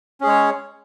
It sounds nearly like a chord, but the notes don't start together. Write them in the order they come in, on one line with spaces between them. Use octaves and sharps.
C#4 G#4 G#3 C#5